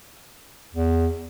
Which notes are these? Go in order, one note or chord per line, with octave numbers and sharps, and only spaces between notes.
E2